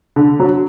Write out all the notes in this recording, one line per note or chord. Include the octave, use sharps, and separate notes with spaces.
D3
F#3